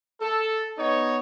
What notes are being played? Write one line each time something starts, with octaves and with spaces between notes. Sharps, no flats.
A4
B3 D#4 C#5